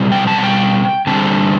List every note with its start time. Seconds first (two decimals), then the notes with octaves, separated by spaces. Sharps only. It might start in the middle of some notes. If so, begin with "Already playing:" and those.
Already playing: B2 G3 C4
0.12 G5
0.27 A5
0.38 F#5
0.44 G5
1.07 D3 G3 C4 A5